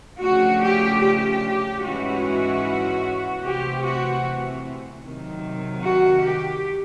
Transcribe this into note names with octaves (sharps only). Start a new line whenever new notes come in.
C#3 F3 A3 D4 F#4
G4
G4
G#2 E3 G#3 C#4 E4 F#4
C3 E3 A3 C4 G4
F#4
C3 D#3 F#3
F#4
G4